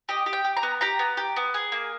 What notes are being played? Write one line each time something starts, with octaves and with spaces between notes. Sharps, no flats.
G4 D#5
G4
G5
G4
A#5
B3
G4 A#5
B3
G4
B3
G#4
A#3